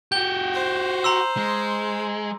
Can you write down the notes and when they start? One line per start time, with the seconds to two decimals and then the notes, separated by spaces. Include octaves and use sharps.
0.12 F#4 G4 G6 G7
0.54 C5
1.04 A#5 C6 E6
1.37 G#3